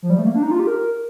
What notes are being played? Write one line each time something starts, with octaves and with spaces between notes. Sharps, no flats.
F3
G3
A3
A#3
D4
D#4
F4
G4
A#4